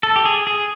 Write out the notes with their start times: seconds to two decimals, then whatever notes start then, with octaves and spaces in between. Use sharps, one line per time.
0.03 A4
0.16 G4
0.25 G#4
0.47 G#4